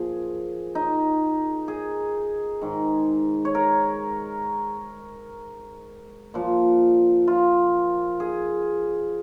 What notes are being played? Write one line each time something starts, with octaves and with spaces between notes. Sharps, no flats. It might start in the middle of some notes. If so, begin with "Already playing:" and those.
Already playing: A#2 F3 G#4
D#4
G#4
G#2 D#3
C#5
A#4
A#2 F3
F4
G#4